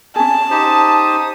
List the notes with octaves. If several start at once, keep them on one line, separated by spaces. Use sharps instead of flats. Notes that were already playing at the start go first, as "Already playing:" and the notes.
C#4 G#4 A5
D#4 G4 C5 D#6